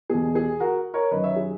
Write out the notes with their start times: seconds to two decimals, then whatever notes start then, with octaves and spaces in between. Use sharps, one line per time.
0.10 E2 B2 G#4
0.35 G#4
0.60 F#4 A#4
0.94 A#4 C#5
1.11 F#2 D#3 B4 D#5
1.23 C#5 E5
1.36 G#4